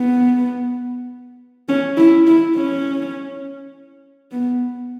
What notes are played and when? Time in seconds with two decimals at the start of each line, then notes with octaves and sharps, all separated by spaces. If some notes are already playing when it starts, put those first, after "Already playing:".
Already playing: B3
1.69 C#4
1.97 E4
2.27 E4
2.56 C#4
4.32 B3